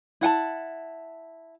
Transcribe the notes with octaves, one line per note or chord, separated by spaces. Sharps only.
E4 F#5 G#5 A5